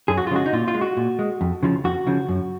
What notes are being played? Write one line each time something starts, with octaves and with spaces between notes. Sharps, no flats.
F#2 G#4
F#4
F4
C#3 F3 G#3 F#4
D#4
A#2 F4
F4
G#3
F#4
A#2
G#3
F2
C#3 F3
F2 F#4
C#3 F3
F#2